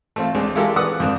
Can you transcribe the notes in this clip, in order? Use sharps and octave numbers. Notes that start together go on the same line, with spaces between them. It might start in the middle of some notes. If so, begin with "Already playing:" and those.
A3 C4 F4
C#2 G#3 C4 D4
G#3 E4 F4 G4 A4 A#4
B4 D5 F#5 D#6 E6
F2 G#2 D#3 C4 D4